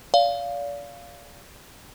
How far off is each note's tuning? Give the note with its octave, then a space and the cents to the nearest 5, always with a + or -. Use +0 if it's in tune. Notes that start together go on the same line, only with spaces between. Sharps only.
D5 -35 F5 +0